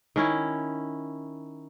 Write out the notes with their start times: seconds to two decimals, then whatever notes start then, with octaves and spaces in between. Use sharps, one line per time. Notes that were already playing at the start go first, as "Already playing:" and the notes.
0.16 D#3 C#4 E4